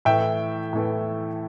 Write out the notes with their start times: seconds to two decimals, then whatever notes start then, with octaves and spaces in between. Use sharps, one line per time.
0.05 A2 E3 A3 E5 G5
0.73 A2 E3 A3